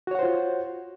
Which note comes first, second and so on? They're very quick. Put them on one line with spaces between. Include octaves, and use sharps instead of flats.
F#4 C#5 F#5 C5 F4